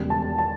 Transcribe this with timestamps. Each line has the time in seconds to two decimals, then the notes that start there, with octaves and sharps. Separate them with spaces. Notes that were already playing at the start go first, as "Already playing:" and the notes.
Already playing: E1 E2 C#3 G3
0.10 A5
0.38 A5